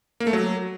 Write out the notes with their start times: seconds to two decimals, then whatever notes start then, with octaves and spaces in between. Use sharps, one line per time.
0.20 A#3
0.27 A3
0.33 F#3